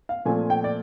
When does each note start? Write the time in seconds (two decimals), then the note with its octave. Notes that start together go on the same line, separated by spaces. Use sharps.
0.09 F5
0.25 A#2 F3 A3 C4 G#5
0.50 G5
0.64 D5